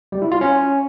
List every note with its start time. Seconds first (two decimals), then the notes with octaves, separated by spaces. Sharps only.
0.12 G3
0.22 E4
0.32 F4
0.41 C#4